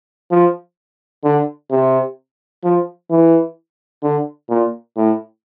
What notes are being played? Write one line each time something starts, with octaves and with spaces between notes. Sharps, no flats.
F3
D3
C3
F3
E3
D3
A#2
A2